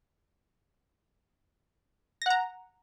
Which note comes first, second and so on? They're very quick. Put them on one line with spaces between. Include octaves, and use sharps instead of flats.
A#6 F#5 A#5